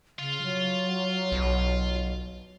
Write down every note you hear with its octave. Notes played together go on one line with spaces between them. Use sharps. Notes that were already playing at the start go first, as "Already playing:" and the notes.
C#3 F4
F#3
B1